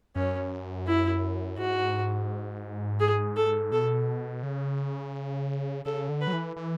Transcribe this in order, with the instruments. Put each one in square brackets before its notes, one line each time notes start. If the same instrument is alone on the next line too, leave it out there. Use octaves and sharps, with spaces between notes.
[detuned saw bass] F#2 [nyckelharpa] C#4
[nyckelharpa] E4
[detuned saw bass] G#2 [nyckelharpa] F#4
[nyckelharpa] G#4
A4
[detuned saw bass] B2 [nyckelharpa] A4
[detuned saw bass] C#3
[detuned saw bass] C#3 [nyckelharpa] A4
[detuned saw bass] D3
[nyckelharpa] B4
[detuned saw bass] F#3
E3
E3